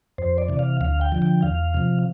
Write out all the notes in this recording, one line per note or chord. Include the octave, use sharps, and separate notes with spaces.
F2 C5
D5
C3 E3
F5
D2 F5
G5
D3 F3
G5
E2 F5
C3 F3